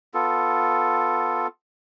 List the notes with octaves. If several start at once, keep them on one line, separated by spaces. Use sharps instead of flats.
B3 F4 A4